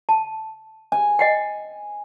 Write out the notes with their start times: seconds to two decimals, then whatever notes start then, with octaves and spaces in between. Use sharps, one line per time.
0.09 A5
0.92 G#5
1.19 D#5 F#5 G5